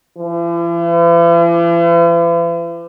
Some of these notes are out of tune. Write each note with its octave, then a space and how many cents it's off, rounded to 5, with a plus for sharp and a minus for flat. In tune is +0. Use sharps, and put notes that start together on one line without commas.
E3 +45